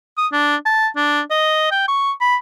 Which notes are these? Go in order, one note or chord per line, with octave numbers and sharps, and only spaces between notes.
D#6
D4
A5
D4
D#5
G5
C#6
B5